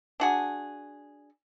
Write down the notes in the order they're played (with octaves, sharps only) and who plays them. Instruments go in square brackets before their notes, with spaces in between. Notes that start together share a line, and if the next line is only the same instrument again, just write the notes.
[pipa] D4 F#4 G#4